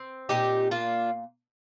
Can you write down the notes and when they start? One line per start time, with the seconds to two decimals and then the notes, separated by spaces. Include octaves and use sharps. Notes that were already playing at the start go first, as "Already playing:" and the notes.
Already playing: C4
0.29 A#2 D#4 G4
0.71 A#3 D4 F4